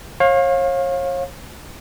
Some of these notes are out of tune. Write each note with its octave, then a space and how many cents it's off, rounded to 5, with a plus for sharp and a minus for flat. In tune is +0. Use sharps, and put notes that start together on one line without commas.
C#5 -35 F5 +15